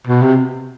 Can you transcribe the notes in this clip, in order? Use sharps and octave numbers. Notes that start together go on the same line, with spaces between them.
B2
C3